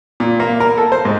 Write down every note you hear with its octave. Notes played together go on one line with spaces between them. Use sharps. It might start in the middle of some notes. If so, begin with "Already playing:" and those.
A#2
A#3
A#4
A4
C5
G#2